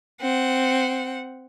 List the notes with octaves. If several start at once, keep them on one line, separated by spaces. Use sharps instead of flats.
C4 F#5